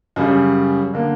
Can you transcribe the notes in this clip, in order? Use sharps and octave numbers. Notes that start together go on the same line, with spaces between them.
F#2 C#3 G3
D3 A#3